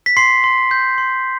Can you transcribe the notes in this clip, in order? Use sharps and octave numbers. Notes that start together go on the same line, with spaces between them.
B6
C6 C7
C6
G6
C6